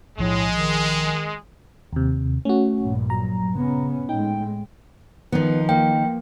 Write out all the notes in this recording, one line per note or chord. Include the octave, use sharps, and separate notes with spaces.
B1 A2 F3 G#3
D#3
D#2 C3
A3 C#4 F#4
A#1 G2
F#3 A#5
C#3 B3 C#4
A2 G#3 D#4 G5
D#3 F3 B3 D#4
A#3 G5